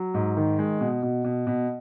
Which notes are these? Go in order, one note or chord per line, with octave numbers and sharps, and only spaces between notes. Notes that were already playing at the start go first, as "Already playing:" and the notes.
Already playing: F#3
G#2
D#3
G#3
B2
B2
B2
B2